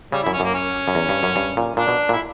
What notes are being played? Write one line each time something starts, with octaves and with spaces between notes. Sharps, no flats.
C#3 G3
F#2 E4
C#4
F#2 A#3
C#4
F#2
E2
G2
F#2
G2
A#2
A#2 D4
B2
A#2
E4